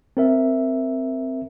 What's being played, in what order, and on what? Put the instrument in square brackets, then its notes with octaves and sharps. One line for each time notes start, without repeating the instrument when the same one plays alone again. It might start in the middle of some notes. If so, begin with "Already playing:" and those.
[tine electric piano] C4 A#4 E5